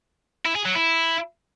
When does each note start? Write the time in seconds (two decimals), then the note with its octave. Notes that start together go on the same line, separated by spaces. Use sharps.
0.45 E4
0.55 G#4
0.65 F#3
0.75 E4